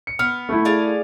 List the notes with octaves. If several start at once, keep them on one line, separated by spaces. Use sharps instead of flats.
C#7
B3 F6
A3 E4
G#4 D5 F5